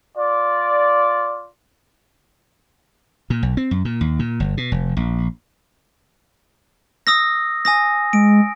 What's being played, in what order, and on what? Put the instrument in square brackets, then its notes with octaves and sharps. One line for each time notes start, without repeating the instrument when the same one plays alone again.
[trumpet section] F4 D5
[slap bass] A#2
B1
C4
F#2
A#2
D#2
A#2
G1
B2
F1
A#1
[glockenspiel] D#6 E6 A#6
G#5 D#6 A#6
[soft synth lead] G#3 [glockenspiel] D7